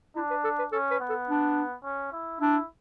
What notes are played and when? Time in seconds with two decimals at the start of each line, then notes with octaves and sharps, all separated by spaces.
0.16 D4 E4
0.30 B4
0.44 A4
0.59 B4
0.72 C#4 A4
0.91 B4
1.00 B3
1.09 A4
1.29 D4
1.84 C#4
2.12 E4
2.40 D4 E4